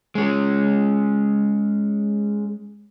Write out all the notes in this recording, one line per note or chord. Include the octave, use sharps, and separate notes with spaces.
G#3 C#4